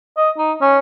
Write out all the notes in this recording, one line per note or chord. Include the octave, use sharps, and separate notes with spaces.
D#5
D#4
C#4